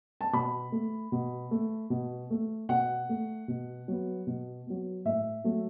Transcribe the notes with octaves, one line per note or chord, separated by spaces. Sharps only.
A5
B2 B5
A3
B2
A3
B2
A3
B2 F#5
A3
B2
F#3 B3
B2
F#3 B3
A2 E5
F#3 A3